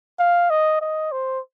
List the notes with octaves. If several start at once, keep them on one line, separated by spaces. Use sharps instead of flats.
F5
D#5
D#5
C5